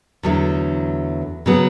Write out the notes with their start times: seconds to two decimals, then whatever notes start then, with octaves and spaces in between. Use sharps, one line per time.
0.23 E2 D3 F#3 A3 E4
1.46 C#3 F#3 B3